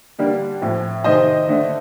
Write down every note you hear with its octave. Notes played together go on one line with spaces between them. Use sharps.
D3 G3 A#3 D4
A2 F3 C4
C3 D#3 A3 C5 D#5
D3 A3 D4